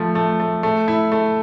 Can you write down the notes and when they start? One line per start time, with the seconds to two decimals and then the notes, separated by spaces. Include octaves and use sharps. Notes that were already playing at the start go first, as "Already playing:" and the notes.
Already playing: F3 A3
0.15 A3
0.40 A3
0.63 A3
0.88 E4
1.12 A3